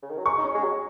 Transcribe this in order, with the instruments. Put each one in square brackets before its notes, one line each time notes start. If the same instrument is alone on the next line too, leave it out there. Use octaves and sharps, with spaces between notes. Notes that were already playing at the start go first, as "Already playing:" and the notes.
[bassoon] C#3
D#3
F#3
[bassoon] G#3 [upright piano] C#6
[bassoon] D#4
C#4
G#3
F#3